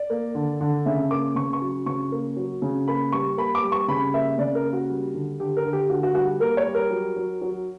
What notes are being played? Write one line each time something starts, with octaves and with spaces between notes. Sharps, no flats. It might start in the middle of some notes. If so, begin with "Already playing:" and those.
Already playing: D5
A#3
D3
D3
C#3 E5
A#3 D6
C#3 C#6
C#6
F#3
C#3 C#6
A#3
F#3
C#3
A#3 B5
G3 C#6
A#3 B5
D6
G3
C#6
C#3 B5
A#3 E5
C#3 D5
A#4
A#3
F#4
G3
D3
D3 G4
A#4
D3
G4
D3 F#4
F#4
G3 F#4
A#3 A#4
C#5
G3
A#4
F#3
F#3
F#3